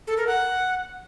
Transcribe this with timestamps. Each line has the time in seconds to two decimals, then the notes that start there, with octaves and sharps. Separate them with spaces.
0.07 A4
0.17 A#4
0.27 F#5